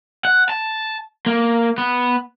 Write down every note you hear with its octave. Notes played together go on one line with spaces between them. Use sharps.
F#5
A5
A#3
B3